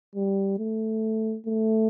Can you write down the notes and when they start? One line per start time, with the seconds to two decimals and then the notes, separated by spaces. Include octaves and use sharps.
0.15 G3
0.59 A3
1.46 A3